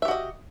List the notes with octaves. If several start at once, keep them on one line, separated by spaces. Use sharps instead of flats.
F#4 G4 D#5 E5